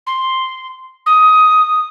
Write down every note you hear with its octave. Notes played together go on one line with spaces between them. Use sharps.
C6
D#6